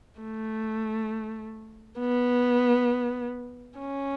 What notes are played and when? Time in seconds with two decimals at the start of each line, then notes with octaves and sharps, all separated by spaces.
0.20 A3
1.99 B3
3.79 C#4